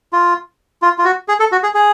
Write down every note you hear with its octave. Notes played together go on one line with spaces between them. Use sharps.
F4
F4
F4
F#4
G#4
A4
F#4
G#4
G#4